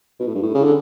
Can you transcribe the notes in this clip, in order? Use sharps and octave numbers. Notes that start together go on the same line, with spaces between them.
B2
A2
G2
A2
C#3
D3